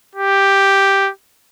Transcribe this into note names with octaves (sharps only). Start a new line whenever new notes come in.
G4